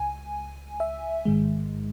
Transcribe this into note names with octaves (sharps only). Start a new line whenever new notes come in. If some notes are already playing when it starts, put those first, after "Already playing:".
Already playing: C#2 G#5
E5
A1 G#2 D#3 G#3